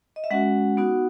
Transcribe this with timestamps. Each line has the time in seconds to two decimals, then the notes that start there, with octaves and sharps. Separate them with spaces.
0.16 D#5
0.24 E5
0.31 G#3 C#4 F#4 F#5
0.77 B3 D#4 F#4